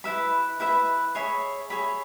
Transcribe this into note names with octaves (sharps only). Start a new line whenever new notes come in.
E4 B4 E5 B5
E4 B4 E5 B5
G#4 C#5 E5 B5
G#4 C#5 E5 B5